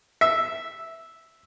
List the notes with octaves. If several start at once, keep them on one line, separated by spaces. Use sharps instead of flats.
E5